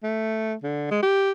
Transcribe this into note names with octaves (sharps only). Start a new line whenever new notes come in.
A3
D3
G#3
G4